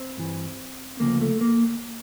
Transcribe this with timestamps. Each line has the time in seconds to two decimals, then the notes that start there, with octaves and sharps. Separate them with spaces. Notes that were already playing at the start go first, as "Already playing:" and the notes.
Already playing: C4
0.17 G2 E3
1.00 D2 C#3 F3 A#3
1.21 A3
1.41 A#3